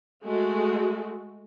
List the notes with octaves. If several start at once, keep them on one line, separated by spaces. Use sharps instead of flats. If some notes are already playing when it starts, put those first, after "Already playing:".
G#3 A3 F#4